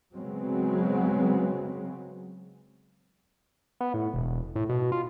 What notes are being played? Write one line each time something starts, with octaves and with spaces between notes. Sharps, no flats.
C#3 F#3 G#3 B3 C4
B3
A2
E1
A2
B2
F4